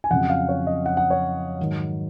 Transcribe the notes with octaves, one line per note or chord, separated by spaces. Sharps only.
G#5
F2 C#3 F#3 F#5
F5
C#5
D#5
F#5
F#5
C#5
G#2 D#3 F#3